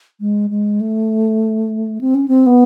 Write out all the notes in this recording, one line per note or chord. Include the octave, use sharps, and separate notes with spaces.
G#3
G#3
A3
C4
C#4
C4
B3